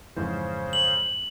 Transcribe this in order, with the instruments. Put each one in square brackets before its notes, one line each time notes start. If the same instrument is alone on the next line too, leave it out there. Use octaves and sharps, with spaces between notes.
[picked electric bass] F2 G#2 E3 [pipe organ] C#3 C5
[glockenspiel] F#7